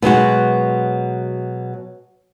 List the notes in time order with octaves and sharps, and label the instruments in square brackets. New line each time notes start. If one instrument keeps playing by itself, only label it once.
[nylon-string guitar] B2 F#3 G#3 F#4